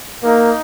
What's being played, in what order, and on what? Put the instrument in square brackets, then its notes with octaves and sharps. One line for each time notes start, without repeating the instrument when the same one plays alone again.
[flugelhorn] A#3 [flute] D#4